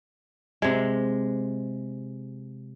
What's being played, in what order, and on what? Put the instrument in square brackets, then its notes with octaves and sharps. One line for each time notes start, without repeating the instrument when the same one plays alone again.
[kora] C3 G#3